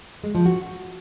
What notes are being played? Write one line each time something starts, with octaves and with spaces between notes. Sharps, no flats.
G#3
F3
F#4